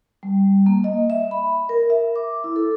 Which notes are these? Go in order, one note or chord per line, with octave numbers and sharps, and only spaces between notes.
G3
A#3
D#5
E5
B5
A#4
E5
D6
E4
A4